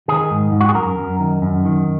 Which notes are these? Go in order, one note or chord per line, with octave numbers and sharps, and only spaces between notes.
D#3 G#4
G#2
G#2
F#4
G#4
F#2 A#4
F#2
D#3
F#2
D#3